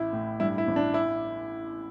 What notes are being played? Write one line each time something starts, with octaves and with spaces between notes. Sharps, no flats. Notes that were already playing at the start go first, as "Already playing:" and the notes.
Already playing: A1 E4
A2
G2 E4
E4
A1
D4
E4